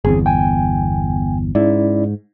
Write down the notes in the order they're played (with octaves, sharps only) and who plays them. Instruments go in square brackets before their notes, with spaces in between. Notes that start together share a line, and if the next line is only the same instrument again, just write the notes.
[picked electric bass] G1 E2 [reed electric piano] C4 G#4
[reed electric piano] G5 G#5
[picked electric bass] G#2 [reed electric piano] C#4 E4 D5